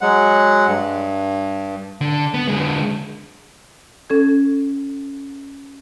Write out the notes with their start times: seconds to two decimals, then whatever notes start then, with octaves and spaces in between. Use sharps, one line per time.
0.01 F#3 G#3 F#5
0.68 G2
2.01 D3
2.34 B3
2.48 D3 G#3
4.10 C#4 A4 G#6